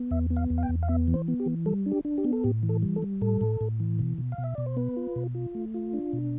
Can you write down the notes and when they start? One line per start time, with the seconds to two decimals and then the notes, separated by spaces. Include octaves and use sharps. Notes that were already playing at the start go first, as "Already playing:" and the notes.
Already playing: B3
0.11 E2 E5
0.30 B3
0.37 F5
0.50 E2
0.58 F5
0.63 G5
0.69 E2
0.83 F5
0.89 B3 E5
1.08 E3
1.14 C5
1.28 B3
1.40 G4
1.46 E3
1.66 G3 A4
1.86 D4
1.92 G4
2.05 D4
2.18 G4
2.25 B3
2.33 A4
2.44 A2 G4
2.63 E3
2.69 A4
2.82 G3
2.96 A4
3.02 G3
3.21 A2 A4
3.41 A2
3.61 A2
3.80 E3
3.99 B2
4.18 B2
4.32 F5
4.38 B2
4.44 E5
4.55 B2 D5
4.66 C5
4.77 B3 B4
4.96 F4
5.16 B2
5.35 F4
5.55 A3
5.74 F4
5.93 D4
6.13 B2